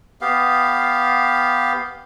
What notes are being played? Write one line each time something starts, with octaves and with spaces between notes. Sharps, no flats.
B3 G4 F5